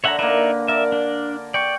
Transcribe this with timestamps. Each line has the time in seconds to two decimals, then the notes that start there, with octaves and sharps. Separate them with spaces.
0.04 D3 C#5 E5 F#5 A#5
0.19 A#3 D#4 B4 D5 E5
0.68 A#4 D5 E5
0.92 D4
1.54 D5 G5 C#6